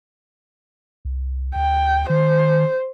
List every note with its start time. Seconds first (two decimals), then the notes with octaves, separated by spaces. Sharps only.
1.05 C2
1.55 D2 G5
2.10 D#3 C5